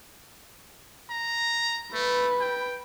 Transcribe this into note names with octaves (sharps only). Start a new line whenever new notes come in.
A#5
A3 B4
G5